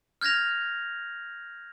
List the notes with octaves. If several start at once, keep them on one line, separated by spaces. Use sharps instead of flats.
F6 G6 G#6 A#6 F7